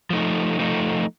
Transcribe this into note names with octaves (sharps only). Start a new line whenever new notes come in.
F3 A3 D#4
F3 A3 D#4